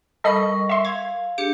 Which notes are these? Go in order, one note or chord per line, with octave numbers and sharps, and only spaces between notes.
G3 A4 A#4 D#5 B5 C#6
E5 C6
F5 G#6
D4 G4 G#4 C#7